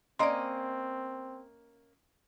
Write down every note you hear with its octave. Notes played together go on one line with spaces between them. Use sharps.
A#3 C4 C#4 D5 D#5 C6